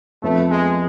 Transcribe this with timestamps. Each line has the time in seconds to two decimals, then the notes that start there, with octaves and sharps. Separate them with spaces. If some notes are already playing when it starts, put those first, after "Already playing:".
0.23 F2 F3 A3 B3
0.51 G#3